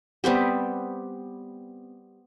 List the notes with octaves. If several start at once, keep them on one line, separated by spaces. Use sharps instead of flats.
G3 B3 C4 G4